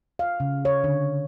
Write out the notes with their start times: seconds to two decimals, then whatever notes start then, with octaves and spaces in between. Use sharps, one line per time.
0.19 F5
0.40 C#3
0.65 C#5
0.84 D3